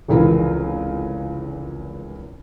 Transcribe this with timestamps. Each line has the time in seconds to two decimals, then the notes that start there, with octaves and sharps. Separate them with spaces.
0.08 F1 C#2 E3 F4 A#4